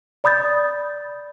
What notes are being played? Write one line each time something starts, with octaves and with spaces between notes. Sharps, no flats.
D5 B5 D#6 G6 A6